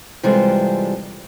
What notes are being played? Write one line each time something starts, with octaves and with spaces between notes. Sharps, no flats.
C3 E3 G3 G#3 F4 A4